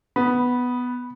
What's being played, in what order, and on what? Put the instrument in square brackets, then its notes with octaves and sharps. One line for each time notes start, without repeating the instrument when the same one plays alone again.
[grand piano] B3 [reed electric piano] B5